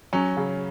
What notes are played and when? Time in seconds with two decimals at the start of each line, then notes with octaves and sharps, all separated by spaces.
0.13 F#3 C#4
0.37 C#3